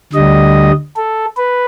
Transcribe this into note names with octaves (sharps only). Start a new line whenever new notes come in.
D2 D3 G3 D#5
A4
B4